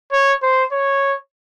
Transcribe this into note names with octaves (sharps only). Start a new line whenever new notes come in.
C#5
C5
C#5